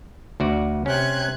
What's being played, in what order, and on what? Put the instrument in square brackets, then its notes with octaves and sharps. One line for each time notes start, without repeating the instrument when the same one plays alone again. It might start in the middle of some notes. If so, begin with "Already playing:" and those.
[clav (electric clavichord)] D2 F#4 D5
[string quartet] C3 F#6 G#6 [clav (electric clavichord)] C#4 G5